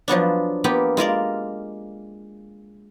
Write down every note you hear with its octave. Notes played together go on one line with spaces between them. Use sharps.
F3 F#3 B3 D4
A#3 B3 F4 G4
G#3 F4 A#4 D5